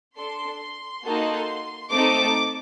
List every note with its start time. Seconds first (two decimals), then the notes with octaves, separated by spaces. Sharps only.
0.17 D4 A4 C6
0.60 C6
1.04 A#3 D#4 F#4 A4
1.92 A3 C4 D#4 A4 D6